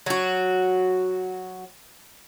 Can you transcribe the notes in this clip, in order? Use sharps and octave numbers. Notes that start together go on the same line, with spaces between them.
F#3 F#4